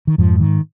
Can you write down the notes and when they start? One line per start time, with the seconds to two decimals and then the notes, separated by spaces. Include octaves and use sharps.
0.07 D#3
0.18 F2 G#2 F3
0.40 D#3